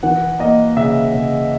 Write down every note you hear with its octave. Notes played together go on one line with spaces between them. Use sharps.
E3 F#5
A#3 D#5
C#3 E5
C#3